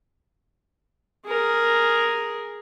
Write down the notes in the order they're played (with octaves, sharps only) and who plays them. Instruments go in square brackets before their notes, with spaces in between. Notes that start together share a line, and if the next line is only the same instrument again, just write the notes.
[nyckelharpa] G#4 A#4